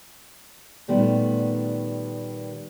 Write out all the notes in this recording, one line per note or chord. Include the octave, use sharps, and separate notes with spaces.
A#2 D#3 G3 A3 B3